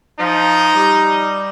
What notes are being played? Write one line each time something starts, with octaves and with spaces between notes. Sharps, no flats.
F3 D#4
G3